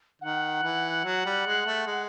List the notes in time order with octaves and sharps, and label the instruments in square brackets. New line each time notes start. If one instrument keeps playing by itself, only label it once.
[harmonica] D#3 [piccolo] F#5
[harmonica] E3
F#3
G3
G#3
A3
G#3